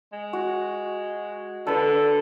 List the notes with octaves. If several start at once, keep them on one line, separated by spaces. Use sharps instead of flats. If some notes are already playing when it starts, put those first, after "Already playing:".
G#3
F#4
D3 A4 B4